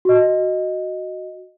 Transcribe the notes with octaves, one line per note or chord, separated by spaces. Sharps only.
F#4 D#5